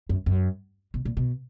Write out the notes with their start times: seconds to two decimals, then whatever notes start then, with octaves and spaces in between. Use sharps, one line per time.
0.09 F#2
0.26 F#2
0.94 B2
1.05 A#2
1.17 B2